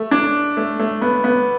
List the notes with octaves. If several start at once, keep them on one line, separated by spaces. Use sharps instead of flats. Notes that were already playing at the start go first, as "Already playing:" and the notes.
Already playing: A3
D4
A3
A3
B3
B3